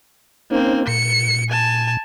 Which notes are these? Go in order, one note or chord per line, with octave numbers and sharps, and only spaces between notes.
A#3 C4 C#4 D#4 C5
A#2 C#7
G#5 A5